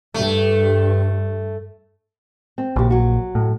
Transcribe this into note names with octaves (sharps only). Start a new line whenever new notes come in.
G2 A3
C4
A#1 C#3 G4
F#3 F#4
A2